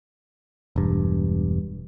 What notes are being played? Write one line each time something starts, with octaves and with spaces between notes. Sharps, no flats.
E1 G2